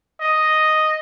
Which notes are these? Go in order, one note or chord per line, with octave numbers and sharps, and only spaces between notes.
D#5